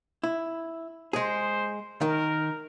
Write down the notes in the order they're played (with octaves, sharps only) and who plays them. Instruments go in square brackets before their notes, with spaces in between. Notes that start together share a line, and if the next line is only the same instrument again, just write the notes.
[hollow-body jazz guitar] E4
[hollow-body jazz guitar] G#3 G#4 [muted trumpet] C5
[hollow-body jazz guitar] D#3 [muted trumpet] A#4